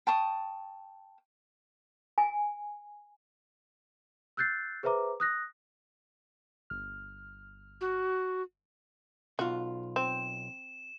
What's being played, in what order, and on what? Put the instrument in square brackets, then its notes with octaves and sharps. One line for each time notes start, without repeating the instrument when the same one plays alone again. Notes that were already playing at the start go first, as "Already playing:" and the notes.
[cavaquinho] G5 A5 C#6 D#6
[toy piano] G#5
[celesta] E6 F#6 G6 A6 C7
G#4 B4 C5 E5 A#5 D6
D#6 F#6 A#6
[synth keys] G1 F6
[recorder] F#4
[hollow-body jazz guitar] B1 F4 [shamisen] F#4
[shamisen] C4 [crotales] E7